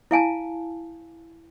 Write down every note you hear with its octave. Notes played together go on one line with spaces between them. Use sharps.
E4 F5 G#5 A5